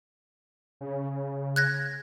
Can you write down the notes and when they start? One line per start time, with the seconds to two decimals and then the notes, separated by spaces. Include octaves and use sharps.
0.81 C#3
1.56 F#6 G#6 A#6